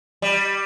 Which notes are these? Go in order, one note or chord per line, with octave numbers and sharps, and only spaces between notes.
G3